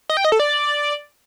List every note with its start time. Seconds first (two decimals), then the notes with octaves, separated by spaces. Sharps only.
0.10 D#5
0.17 G5
0.25 D#5
0.32 A4
0.40 D5